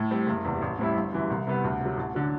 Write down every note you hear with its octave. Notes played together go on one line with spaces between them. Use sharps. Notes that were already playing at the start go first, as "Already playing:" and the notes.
Already playing: A2
G3 C4
F#1
E2 C3
A1
A2 G3 C4 E4
G1
F#2 E3 G3
C2
C3 G3 B3
D2
C3 F#3
A1
D3 F#3